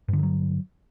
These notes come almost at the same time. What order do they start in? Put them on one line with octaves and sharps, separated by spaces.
G2 D3 D#3 F#3